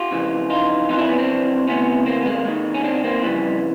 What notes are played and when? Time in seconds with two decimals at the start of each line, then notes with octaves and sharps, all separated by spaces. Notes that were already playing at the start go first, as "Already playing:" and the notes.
Already playing: F4 G4
0.11 F2 C#3 E3
0.50 D#4 F4
0.89 F2 C3 E3 D#4 F4
0.98 D4 E4
1.09 B3 C#4
1.18 C4 D4
1.67 D2 C3 E3 B3 C#4
2.06 A#3 C4
2.20 B3
2.26 G#3 A#3
2.45 D#2 D#3 G#3
2.74 C#4
2.84 C4 D4
3.04 A#3 C4
3.23 F2 C#3 E3 G3